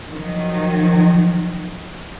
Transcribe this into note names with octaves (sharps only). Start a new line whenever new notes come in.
D#3 F3 F#3